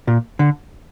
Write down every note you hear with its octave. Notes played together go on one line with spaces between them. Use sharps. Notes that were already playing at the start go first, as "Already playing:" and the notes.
A#2
D3